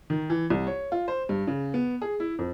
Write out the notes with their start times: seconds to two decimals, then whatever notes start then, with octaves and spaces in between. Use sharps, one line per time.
0.10 D#3
0.30 E3
0.50 C2
0.67 C#5
0.92 F4
1.08 C5
1.29 G2
1.47 C#3
1.74 B3
2.01 G#4
2.20 E4
2.39 F2